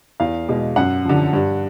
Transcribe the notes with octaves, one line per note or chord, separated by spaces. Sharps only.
E2 F5
B2 G#3
F#2 F#5
D3 F3
G2